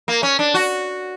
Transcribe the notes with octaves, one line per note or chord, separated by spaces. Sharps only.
A#3
C#4
D4
F#4